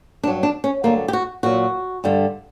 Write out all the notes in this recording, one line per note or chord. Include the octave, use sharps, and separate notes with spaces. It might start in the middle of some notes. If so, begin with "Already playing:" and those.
G2 F#3 D4
D4
C#4
G2 D3 F#3 A#3
G4
F#4
A#2 F#3 F#4
G2 D3 G3